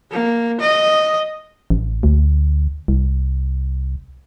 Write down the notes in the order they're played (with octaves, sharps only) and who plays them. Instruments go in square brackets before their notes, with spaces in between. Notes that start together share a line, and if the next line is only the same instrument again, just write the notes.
[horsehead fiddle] A#3
D#5
[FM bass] A1
D2
C2